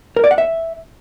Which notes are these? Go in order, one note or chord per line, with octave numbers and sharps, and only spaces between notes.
A#4
D5
F#5
E5